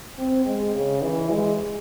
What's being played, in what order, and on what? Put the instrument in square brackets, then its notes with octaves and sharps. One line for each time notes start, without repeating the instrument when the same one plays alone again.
[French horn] C4
G#3
C#3
E3
G#3